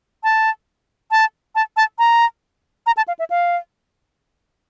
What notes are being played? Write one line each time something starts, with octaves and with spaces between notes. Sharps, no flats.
A5
A5
A5
A5
A#5
A#5
A5
F5
E5
F5